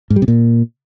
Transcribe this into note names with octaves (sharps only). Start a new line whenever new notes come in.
G#2
G3
C3
A#2